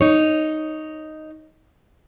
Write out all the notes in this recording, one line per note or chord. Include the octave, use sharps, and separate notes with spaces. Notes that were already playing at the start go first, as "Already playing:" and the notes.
D#4 C#5